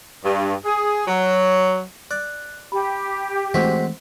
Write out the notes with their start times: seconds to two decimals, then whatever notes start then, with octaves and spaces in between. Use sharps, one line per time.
0.25 G2
0.65 G#4
1.07 F#3
2.11 D5 F#6
2.72 G4 B5
3.54 E3 G#3 A3 C4 F#4 C5 B6